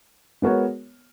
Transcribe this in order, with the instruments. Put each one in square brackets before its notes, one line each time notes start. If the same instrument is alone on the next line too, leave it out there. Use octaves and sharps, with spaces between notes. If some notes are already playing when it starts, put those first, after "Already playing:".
[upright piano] G#3 B3 F#4 A#4 C#5